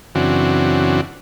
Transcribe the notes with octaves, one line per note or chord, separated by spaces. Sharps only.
F#2 C#3 E3 C4 D4 F#4